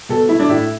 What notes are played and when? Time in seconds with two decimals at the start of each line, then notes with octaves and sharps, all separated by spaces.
0.09 B2 A4
0.29 A3 E4
0.39 D4
0.49 A2 E4